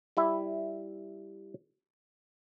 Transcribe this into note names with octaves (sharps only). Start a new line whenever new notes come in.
G3 E4 E5